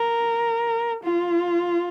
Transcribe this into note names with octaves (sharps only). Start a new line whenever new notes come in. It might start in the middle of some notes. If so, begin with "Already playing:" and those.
Already playing: A#4
F4